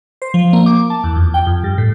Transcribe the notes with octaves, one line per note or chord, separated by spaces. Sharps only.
C5
F3
A#3
D6
A5
E2
F2
G5
F2
G2
A2